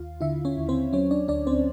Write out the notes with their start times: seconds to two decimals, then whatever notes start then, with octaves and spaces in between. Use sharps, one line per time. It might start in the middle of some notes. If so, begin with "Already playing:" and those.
Already playing: D#2 F4 F5
0.21 D3 E4 E5
0.45 C#4 C#5
0.57 D#2
0.69 C4 C5
0.93 F#3 C#4 C#5
1.11 D4 D5
1.28 D2 D4 D5
1.47 C4 C5